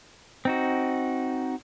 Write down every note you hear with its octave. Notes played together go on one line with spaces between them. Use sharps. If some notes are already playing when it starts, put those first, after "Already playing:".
C4 D#4 F#4